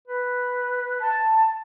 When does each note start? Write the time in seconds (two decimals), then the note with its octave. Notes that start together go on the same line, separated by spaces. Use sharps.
0.08 B4
1.01 A5